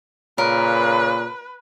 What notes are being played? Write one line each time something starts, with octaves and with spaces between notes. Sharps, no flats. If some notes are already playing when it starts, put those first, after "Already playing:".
A#2 C#3 A#4 B4